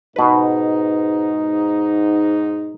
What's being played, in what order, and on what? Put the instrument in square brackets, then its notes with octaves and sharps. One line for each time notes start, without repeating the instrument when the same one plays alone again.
[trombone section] G#2 D#4 [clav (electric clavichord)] B2 B4